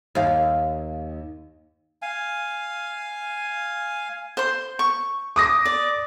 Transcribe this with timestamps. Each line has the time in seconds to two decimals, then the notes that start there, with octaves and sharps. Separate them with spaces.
0.15 D#2 F5
2.02 F5 G#5
4.37 C5 C6
4.79 C#6
5.36 D6 D#6 A#6
5.65 D5